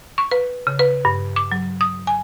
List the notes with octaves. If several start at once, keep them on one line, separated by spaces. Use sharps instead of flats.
C#6
B4
C#3
B4
G2
D6
F#3
D#6
G#5